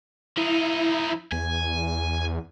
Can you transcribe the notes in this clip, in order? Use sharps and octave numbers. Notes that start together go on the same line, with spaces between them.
F3 D#4 E4
E2 G#5